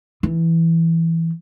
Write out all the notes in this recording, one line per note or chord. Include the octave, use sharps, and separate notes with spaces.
E3